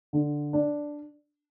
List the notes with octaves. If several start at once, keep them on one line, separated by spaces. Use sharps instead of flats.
D3
D4